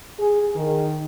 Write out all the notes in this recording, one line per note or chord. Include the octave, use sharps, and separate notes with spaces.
G#4
D#3